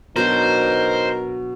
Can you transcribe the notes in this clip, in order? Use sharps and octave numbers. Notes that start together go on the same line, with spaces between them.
B2 F#3 D4 D#4 A#4 C5